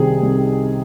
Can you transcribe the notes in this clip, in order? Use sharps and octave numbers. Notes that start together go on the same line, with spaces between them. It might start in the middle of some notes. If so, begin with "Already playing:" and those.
Already playing: C2 C3 D#3 G3 G#4
C2